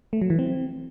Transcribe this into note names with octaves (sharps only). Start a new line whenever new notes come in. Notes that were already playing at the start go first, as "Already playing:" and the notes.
A3
F#3
E3
C4